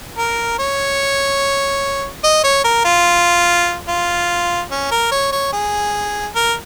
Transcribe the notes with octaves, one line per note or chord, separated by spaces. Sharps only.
A#4
C#5
D#5
C#5
A#4
F4
F4
C#4
A#4
C#5
C#5
G#4
A#4